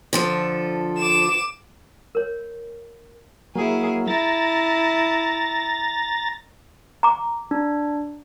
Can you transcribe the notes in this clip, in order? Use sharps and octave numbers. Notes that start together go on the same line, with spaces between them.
D3 F3 A4
D6 E7
A#4 C#5
F#3 A#3 E4 G#4
E4 A#5 A6
A#5 D6
D4